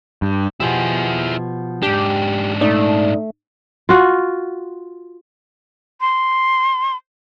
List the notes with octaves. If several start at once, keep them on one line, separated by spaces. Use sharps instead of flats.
G2
B2 F3 E4 G4 G#4
G#2 D4 G4
A#2 A3 D#4 D5
F4 F#4
C6